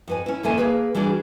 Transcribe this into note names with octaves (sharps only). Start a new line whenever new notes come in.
F2 B4 G#5
C#4 E4
F2 D#3 A#3 A4 E5 G#5
A#3 G#4 B4
E3 G3 D4 F#4 G#4